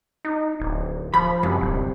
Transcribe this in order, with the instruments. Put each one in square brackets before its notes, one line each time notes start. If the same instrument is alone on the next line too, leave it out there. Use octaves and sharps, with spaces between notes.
[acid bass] D#4
D1
[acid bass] F3 [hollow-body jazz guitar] B5
[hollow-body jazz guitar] C2 [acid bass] F#2
[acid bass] D1